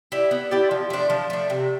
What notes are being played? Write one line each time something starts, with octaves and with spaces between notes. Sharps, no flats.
E4 G4 D5
B3
E4 G4 D5
F3
A3 D4
F3
A3 D4
C3